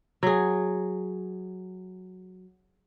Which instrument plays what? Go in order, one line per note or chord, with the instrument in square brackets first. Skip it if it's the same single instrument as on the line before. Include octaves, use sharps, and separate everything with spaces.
[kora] F#3 G#4